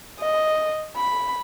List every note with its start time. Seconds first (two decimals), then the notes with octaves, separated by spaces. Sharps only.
0.20 D#5
0.96 B5